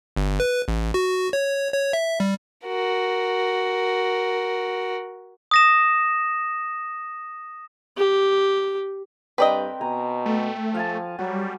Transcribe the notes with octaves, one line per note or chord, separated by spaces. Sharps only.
G1
B4
A1
F#4
C#5
C#5
E5
G3
F#4 A#4
D#6 A#6 E7
G4
G2 C4 A#4 B4 D5 D#5 B5
B2 G#5 A#5
A3 A4
F3 F5 G#5 A5
F#3 G3 F#4